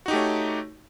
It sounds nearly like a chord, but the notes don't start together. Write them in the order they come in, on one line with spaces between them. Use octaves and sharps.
F#4 D#4 G4 A3 C#5